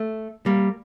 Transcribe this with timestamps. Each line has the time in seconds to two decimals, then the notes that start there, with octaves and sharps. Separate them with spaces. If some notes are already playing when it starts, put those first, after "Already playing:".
Already playing: A3
0.46 G3 A#3